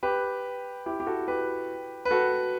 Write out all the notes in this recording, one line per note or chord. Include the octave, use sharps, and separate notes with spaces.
G4 B4
E4 G4
G4
F#4 A4
G4 B4
B4
F#4 A4